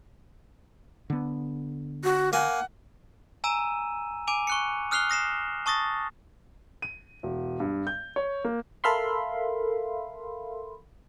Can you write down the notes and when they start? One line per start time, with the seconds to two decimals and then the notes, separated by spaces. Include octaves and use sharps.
1.10 D3 B3
2.04 F#4
2.33 A#3 F#5 G#5
3.44 G#5 A#5 E6 D#7 E7
4.27 G#5 D6 D#7 F7
4.47 C#6 F#6 C#7
4.91 D#6 F6 F#6 C7 F7 G7
5.10 D#6 A#6 C7 E7
5.66 A5 C#6 D#6 A6 A#6
6.82 D#7
7.23 E1
7.60 G2
7.87 G6
8.16 C#5
8.44 A#3
8.84 A4 A#4 E5 F5 B5 C6